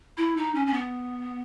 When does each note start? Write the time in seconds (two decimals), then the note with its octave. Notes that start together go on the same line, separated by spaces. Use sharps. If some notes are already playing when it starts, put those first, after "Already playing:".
0.17 E4
0.37 D#4
0.55 C#4
0.67 C#4
0.73 B3